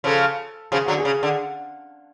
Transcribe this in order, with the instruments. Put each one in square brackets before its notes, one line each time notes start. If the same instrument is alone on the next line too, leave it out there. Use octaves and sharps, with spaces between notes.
[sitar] C#3 F3 [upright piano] A4
[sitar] C#3 F3 [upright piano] G#4
[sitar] D3 F#3 [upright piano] F#4
[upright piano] G#4
[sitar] C#3
D3